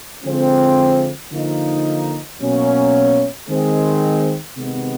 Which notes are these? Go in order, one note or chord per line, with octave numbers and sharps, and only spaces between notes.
D3 F3 G#3 C4
D3 F3 A#3 D#4
B2 F#3 A#3 C#4
D#3 G#3 C4
C3 D#3 G#3 B3